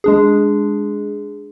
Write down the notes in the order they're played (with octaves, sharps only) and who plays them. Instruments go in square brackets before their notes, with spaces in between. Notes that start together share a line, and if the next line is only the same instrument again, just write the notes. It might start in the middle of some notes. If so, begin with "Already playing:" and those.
[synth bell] G#3 D4 G#4